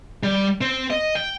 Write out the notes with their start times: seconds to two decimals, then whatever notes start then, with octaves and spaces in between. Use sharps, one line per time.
0.23 G3
0.61 C4
0.90 D#5
1.15 G5